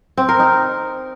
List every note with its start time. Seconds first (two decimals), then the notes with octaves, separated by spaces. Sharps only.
0.17 C4
0.29 A#4
0.40 D#4